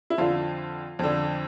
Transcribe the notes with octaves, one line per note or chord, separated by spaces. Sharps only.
E4
F2 D3 F4
F2 D3